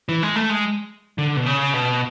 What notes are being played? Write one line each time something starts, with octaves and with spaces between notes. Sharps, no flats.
E3
G#3
A3
G#3
D3
B2
C#3
B2